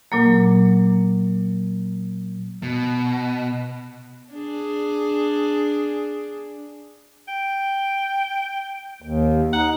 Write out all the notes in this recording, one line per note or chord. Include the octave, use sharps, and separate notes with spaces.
A#2 F#3 A#3
B2
D4 G#4
G5
D#2
D#4 F#5